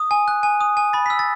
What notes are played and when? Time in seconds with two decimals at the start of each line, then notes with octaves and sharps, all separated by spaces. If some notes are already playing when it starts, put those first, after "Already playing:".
Already playing: D#6
0.11 G#5
0.28 F#6
0.43 G#5
0.61 D#6
0.77 G#5
0.93 B5 A6
1.06 E6 B6
1.19 A6